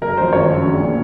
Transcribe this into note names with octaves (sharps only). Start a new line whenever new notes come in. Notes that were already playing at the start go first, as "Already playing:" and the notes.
F#1 A#4
F#2 F3 C5
G#1 C#5
F#2 C#3 F#3
A#1
A#2 F3